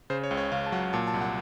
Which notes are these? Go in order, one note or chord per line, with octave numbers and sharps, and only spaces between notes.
C#3 C5
C#5
C#2
C#5
C#2 F5
A5
F#3 F#5
A#2 A5
A5
C2
F#5